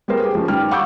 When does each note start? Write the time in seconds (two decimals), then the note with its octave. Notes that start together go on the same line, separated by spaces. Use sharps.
0.08 G3 B3 G#4 A#4 C5
0.20 G4 G#4
0.35 F3 C#4
0.48 D#3 G3 G4 F6
0.71 F5 F#5 C#6 D6 E6 G6